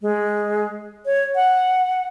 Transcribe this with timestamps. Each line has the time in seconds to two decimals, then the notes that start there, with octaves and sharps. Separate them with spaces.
0.02 G#3
1.06 C#5
1.35 F#5